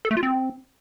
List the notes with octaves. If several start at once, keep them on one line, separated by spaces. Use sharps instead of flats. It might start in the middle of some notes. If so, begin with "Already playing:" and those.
A4
A3
F4
C4